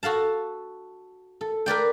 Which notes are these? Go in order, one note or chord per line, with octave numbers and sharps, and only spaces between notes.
F#4 A4 F5 A5
A4
A#4 B4 D5 G5